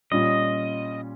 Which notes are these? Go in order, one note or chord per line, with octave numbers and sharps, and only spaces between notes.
A#2 G3 C#4 F4 D#5